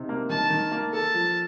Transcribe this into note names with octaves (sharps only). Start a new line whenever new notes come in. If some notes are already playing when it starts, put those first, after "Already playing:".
Already playing: C3 D#4
A#3
D#3 A5
D#3
A#3
A4 A5
F3